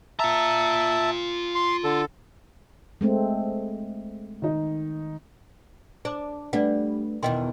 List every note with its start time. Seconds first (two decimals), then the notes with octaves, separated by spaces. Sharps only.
0.20 F4 E5 A5 A#5
1.55 C6
1.84 D3 A4
3.01 G#3 A3 C4
4.42 D#3 D#4
6.05 D4 C5 D6
6.53 G3 A3 D4 B4 D5 F#5
7.23 E2 B2 D#3 D#5 G5 C6